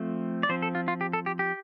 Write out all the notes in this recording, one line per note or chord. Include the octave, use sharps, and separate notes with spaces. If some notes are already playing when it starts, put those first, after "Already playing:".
Already playing: F3 A3 C4
D5
F3 C4 C5
A4
F4
F4
G4
A4
G4
G4